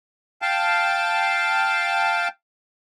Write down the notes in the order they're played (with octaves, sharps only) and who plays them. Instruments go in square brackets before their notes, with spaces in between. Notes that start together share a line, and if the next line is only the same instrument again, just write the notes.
[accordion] F5 G5 A5